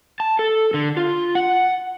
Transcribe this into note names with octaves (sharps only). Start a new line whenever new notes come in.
A5
A4
D3
F4
F#5